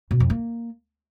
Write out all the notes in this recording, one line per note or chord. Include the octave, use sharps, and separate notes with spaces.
B2
F2
A#3